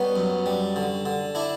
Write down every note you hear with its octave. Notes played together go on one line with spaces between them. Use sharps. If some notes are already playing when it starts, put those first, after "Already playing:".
Already playing: G3 B3 C#4 D#4
F#2
G3
D3
D3
D4 E4